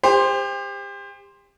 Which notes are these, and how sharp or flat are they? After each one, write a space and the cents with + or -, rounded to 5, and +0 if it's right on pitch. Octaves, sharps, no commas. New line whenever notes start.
G4 +35 C5 +0